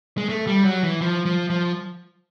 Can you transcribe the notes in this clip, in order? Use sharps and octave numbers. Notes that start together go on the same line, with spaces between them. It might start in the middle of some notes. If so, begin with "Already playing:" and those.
G#3
A3
G3
F#3
E3
F3
F3
F3